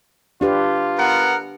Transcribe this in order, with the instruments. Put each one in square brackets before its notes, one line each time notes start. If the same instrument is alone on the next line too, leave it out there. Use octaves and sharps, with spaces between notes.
[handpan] D4 G4 B4 [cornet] F4
[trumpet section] B3 A#4 F#5